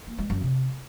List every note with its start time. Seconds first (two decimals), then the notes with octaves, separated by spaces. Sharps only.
0.07 A#3
0.18 G#3
0.30 F#2
0.41 C3